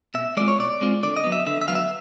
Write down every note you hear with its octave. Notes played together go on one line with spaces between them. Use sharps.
B2 E5
G#3 C4 F4 D5
C#5
B2 D5
G#3 C4 F4
D3 D5
D#5
F#3 B3
E5
D3 E5
E5
F#3 B3 F5
E5